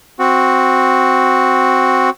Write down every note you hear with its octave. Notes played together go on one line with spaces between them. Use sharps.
C4 F#4